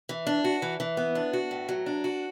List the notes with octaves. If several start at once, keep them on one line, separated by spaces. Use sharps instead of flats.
E3
D4
F#4
E3
E3
B3
D4
F#4
A2
F#3
D4
F#4